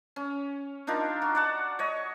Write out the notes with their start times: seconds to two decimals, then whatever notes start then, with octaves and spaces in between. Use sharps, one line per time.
0.16 C#4
0.87 D4 D#4 F4 A#4
1.22 F#4
1.35 D5 F#5 A5
1.79 C#5 D#5